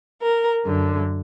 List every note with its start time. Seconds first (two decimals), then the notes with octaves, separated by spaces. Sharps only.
0.20 A#4
0.65 F#2 D3